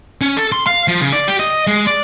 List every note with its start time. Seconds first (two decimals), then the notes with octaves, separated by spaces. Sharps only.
0.21 C#4
0.37 A4
0.52 C6
0.67 F5
0.88 F3
1.01 C#3
1.12 D5
1.28 G4
1.39 D#5
1.67 G#3
1.87 D5